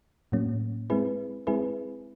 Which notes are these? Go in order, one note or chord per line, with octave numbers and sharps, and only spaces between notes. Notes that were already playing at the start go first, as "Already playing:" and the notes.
A2 F#3 A#3 C#4
G#3 C4 E4 G#4 B4
G#3 C4 E4 G#4 B4